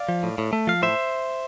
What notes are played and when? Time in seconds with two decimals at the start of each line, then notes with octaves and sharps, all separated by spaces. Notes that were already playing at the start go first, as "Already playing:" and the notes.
Already playing: D5 F5
0.09 F3
0.23 A2
0.38 A2
0.53 A3
0.67 F3 F5
0.82 A2 C5 E5